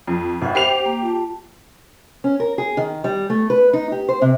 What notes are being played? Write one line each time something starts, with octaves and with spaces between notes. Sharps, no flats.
F2
G#1 E5 F#5 B5
G4 C5 C7 F7
A#3
F4 A5
C#4
A#4
G#4
D#3
G3
A3
B4
D#4
G4
C5
C3